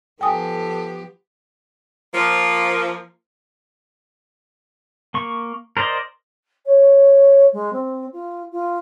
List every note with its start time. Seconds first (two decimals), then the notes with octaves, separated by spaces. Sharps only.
0.21 F3 B3 G4 A4 G5 G#5 D#6
2.14 F3 A#3
5.14 A#3 C#6
5.77 A#4 C5 D5 D#5
6.66 C#5
7.53 G#3
7.73 C4
8.13 F4
8.52 F4